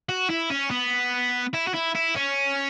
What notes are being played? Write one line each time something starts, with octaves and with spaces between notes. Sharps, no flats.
F#4
E4
C#4
B3
E4
F#4
E4
E4
C#4